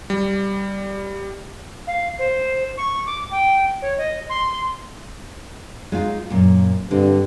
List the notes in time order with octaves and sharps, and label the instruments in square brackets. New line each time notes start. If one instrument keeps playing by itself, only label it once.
[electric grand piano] G3
[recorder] F5
C5
C#6
D6
G5
C#5
D#5
C6
[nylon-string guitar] G#3 D#4 F4
F#2 A#2
[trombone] G2 [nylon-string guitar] D3 C4